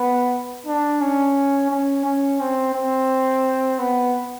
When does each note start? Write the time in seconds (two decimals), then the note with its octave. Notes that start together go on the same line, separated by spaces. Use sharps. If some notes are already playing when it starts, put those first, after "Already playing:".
Already playing: B3
0.66 D4
1.01 C#4
1.70 C#4
2.05 C#4
2.40 C4
2.74 C4
3.79 B3